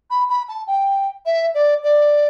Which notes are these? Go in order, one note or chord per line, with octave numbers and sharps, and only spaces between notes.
B5
B5
A5
G5
E5
D5
D5